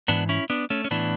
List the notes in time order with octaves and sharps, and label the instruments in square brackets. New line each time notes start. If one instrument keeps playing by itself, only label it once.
[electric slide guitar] G#2 E3 B3 D4
C#4 E4
B3 D4
A3 C#4
C#4
A2 E3 B3 D4